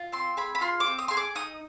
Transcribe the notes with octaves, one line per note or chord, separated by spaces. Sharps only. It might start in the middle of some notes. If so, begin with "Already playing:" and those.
Already playing: F4
C4 C6
G#4 B5
B5
F4 C6
D6
C4
D#6
G#4 C6
D6
D#4 D#6